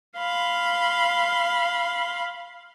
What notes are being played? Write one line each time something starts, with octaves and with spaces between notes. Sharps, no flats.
F5 B5 C6